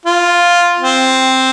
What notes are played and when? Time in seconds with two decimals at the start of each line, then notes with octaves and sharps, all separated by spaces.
0.05 F4
0.80 C4